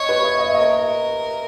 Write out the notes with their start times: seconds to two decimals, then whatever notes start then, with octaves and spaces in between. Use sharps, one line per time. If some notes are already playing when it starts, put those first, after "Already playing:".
Already playing: C#5 D#5
0.09 B4
0.24 D#5
0.39 D#5
0.47 E5
0.54 A#4 D#5